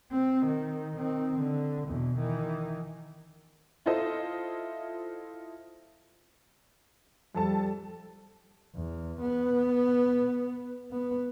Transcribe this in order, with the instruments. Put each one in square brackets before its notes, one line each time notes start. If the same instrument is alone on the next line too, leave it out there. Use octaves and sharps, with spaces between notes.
[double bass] C4
D#3
D#3 C4
D3
E2 B2
D#3 E3
[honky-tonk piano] E4 F4 A4 C5 D#5
[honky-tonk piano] F2 A4 A5 [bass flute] G3
[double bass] E2
B3
B3